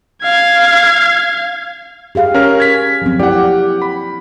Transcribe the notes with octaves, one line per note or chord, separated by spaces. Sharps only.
F5 G#6
G4 G#4 F5
C#4 A#4 F6
G#6 B6
F3 F#3 C4
A#3 E4 G4 D5 F#5
B5